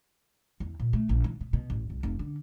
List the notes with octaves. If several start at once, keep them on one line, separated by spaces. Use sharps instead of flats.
E2
A#2
A3
A#1
E3
B2
B2
A1
C2
F1
D3